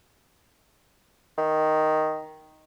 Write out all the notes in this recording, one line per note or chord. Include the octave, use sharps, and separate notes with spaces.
D#3